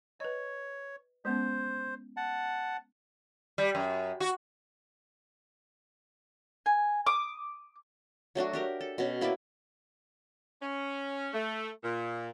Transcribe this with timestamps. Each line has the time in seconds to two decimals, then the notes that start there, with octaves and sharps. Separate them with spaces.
0.20 B4 C#5 D#5
1.25 G#3 B3 C#4 C5
2.17 F#5 A5
3.58 G3
3.75 F#2
4.20 F#4
6.66 G#5
7.07 D6 D#6
8.35 F#3 A3 D4 F#4
8.53 D4 G4 A#4
8.81 A4
8.98 B2 C#4
9.21 A#3 E4 B4 D5
10.62 C#4
11.34 A3
11.84 A#2